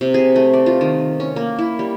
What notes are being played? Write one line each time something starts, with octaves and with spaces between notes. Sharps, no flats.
C3
G#4
A3
D5
F4
D#3
C#4
A#3
E4
G3